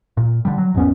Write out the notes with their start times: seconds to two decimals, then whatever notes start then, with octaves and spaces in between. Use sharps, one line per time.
0.17 A#2
0.45 D3 G3
0.58 F#3
0.74 G#1 E2 B3 C#4